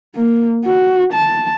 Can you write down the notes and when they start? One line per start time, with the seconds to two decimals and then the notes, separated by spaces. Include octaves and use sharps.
0.16 A#3
0.66 F#4
1.13 A5